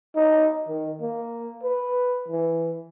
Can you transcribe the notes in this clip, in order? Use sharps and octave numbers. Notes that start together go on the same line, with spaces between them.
D#4
D#3
A#3
B4
E3